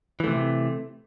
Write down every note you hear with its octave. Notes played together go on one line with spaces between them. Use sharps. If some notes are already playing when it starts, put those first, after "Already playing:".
C3 E3 A3